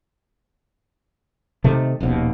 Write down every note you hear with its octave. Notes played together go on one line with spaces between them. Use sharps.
C3 D#3 A3
D#1 A#1 D#2 B2